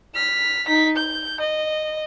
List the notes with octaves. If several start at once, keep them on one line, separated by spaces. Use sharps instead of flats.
F6 B6
D#4 B6
G6
D#5